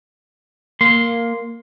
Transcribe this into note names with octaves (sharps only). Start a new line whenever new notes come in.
A#3 C6